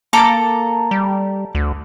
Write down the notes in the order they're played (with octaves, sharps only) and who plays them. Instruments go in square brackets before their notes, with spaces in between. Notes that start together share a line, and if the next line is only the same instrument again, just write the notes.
[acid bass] A#3 [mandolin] A4 A#5 D6
[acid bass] G3
D2